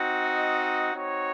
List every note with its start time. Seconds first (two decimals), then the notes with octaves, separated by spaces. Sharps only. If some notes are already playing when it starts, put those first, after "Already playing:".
Already playing: C4 D#4 F#4
0.23 D#5
0.93 C4 D#4 F#4 C#5